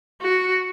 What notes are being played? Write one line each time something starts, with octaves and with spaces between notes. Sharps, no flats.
F#4